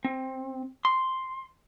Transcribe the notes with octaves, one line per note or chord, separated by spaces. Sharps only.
C4
C6